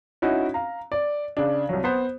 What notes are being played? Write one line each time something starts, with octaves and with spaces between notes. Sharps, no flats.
C#4 D#4 E4 F#4
F5 A#5
D5
C#3 D4
C2 F#3
B3 C5